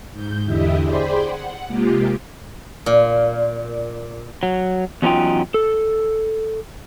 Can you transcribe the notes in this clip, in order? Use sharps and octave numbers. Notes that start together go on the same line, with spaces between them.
G#2 G6
E2 D3 E4 G4 D#5 E5
G#4 C5 D5 G5 B5 C6
F#5
C3 G#3 A#3 F4 G4
A#2
F#3
E2 F#3 C#4 D#4 F4 G5
A4